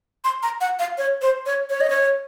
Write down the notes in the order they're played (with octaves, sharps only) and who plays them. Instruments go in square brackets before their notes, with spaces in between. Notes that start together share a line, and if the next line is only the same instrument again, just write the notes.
[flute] C6
A#5
F#5
F5
C#5
C5
C#5
C#5
D#5
C#5